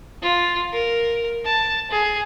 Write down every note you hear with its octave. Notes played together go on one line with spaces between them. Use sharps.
F4
A#4
A5
G#4